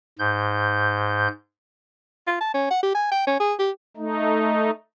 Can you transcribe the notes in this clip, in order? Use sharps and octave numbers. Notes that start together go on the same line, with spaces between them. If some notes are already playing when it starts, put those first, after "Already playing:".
G#2 G6
F4
A5
C#4
F#5
G4
G#5
G5
C#4
G#4
G4
A3 D#4